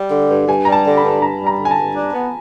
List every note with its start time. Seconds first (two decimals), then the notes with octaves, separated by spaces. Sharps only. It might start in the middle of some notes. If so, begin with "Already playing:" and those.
Already playing: G3
0.11 D3
0.30 G2
0.48 G2 G#5
0.65 G3 A#5
0.72 A5
0.85 D3
0.97 B5
1.03 G2
1.22 G2 A#5
1.40 G3
1.47 A#5
1.59 D3
1.65 G#5
1.71 A5
1.77 G2
1.95 D4
2.13 B3